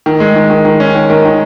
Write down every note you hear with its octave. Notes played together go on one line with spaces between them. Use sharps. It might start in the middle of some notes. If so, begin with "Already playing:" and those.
D#3
G#3
D#3
D#3
D#3
C#4
D#3
D#3
D#3